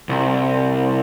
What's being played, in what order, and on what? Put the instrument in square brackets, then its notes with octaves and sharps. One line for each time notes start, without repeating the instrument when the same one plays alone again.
[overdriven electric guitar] C2